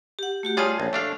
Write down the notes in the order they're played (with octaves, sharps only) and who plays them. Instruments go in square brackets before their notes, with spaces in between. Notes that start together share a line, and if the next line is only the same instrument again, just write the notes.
[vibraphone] G4 F#5
A3 F#4 G4
[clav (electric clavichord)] G3 F4 G#4 [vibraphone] C#5 A5
[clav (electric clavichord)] A#1
A3 D4 F5